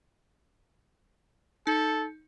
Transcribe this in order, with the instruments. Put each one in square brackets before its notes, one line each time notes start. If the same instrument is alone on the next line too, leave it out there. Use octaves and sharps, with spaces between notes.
[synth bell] D#4 [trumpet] A4